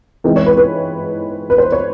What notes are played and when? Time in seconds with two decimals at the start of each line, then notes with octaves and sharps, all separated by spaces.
0.24 E3 G#3 C4 D#4
0.36 C#5
0.46 B4
0.57 B4
1.50 B4
1.58 C5
1.72 C#5